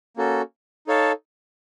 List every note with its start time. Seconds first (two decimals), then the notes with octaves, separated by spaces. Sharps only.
0.17 A#3 C#4 F#4 A4
0.87 D#4 A4 C#5 F5 A5